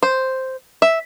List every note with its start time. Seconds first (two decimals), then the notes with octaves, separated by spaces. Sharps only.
0.03 C5
0.82 E5